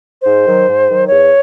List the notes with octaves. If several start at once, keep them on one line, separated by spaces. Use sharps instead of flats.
G#2 C5
D#3 F#3
G#2
D#3 F#3
E2 C#5